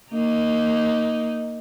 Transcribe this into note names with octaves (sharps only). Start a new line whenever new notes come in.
A#3 D#4